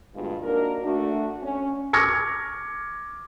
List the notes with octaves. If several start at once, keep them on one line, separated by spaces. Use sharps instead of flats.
D2 G2 B2 G#3 F4
A#3 D4 D#4 F#4 A#4
A3 D4 F#4
C#4
C#6 D6 F6 G#6 A#6 C#7